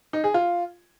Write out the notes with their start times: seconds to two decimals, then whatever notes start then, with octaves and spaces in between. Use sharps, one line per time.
0.13 D#4
0.24 G#4
0.34 F4